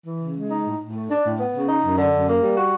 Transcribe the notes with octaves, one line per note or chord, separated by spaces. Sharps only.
E3
C#3
G#3
D#4
A2
A2
A3
D4
A2
B3
C#3
D#4
F#2
D3
F#2
A#3
G3
F#4